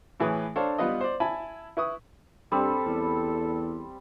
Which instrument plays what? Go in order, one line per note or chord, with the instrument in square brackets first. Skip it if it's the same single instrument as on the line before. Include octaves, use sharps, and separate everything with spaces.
[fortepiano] A2 E3 G#4 B4 C#5 D#6
D4 A4 C5 C#5 F5
G3 B3 F4 B4 D#5
C5 D5
E4 G#5 A5 B5
E4 B4 C#6 D#6
[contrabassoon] G2 [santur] G3 C4 [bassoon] A4
[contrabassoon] E2